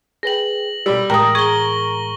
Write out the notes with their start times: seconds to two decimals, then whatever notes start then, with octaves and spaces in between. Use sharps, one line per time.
0.23 G#4 B4 G5 A#6 F#7
0.86 B2 G3 B5 E6
1.10 A2 E3 G#3 A#4 G5 D#6
1.35 G#4 C#6 G7